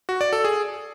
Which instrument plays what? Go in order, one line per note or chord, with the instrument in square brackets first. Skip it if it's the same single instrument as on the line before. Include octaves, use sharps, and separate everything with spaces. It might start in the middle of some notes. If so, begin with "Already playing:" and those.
[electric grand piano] F#4
D5
A4
G#4